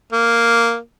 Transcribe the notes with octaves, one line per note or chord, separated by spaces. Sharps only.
A#3